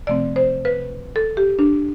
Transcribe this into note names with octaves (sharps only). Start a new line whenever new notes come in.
C3 F3 A3 C4 D5
C5
B4
A4
G4
D4